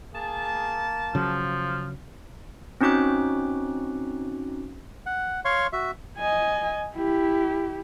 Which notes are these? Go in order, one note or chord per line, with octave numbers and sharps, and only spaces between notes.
A#3 G#4 A5
C#3 F3 F#3
C4 C#4 D#4 F#4 D6 F#6
F#5
C#5 F5 C6 C#6
F#4 E5
D#5 G#5
E4 G4